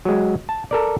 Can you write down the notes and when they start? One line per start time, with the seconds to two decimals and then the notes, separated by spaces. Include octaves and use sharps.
0.05 F#3 G#3
0.49 A5
0.71 A4 A#4 D5